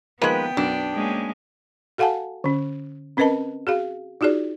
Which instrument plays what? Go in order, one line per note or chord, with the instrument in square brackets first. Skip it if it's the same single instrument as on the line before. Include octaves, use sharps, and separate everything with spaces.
[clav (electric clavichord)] D#3 F3 A#3 [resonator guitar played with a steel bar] G#3 B4 [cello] B3 G5
[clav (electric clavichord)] B1 F#2 [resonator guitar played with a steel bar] D4
[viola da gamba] G#3 A#3 C#4
[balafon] F#4 A4 F5 F#5 G#5 A5
D3 C#4
C4 C#4 A#4 B4 D#5 A5
F#4 G#4 F5
D#4 F4 F#4 G#4 D5